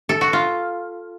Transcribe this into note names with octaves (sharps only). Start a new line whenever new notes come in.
A4
F#4
F4